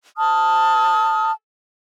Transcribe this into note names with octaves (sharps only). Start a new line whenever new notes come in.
A5 D#6 F6